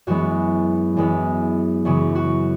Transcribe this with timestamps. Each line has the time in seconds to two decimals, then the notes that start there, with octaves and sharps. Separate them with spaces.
0.07 F#2 E3 G#3 B3 F#4
0.96 F#2 E3 G#3 B3
1.85 F#2 C#3 E3 F#4
2.15 F#4